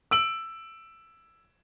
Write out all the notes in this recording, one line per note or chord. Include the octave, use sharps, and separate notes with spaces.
E6 D7 F#7